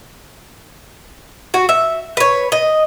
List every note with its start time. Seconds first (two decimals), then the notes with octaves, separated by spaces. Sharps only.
1.54 F#4
1.69 E5
2.17 B4 C#5
2.52 D#5